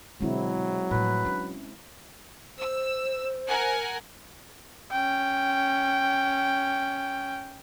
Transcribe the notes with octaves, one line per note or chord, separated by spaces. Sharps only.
B2 D3 F#3 G#3 C4 E4
A2 F3 B4
C#4 D4
C5 E6
A#4 F#5 G#5
C#4 G5